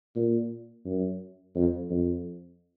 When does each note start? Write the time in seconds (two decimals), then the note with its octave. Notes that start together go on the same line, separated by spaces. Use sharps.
0.16 A#2
0.86 F#2
1.56 F2
1.90 F2